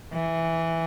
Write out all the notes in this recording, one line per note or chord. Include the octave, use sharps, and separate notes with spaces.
E3